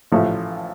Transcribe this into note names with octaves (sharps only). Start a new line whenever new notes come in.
A1 A2 F3 A3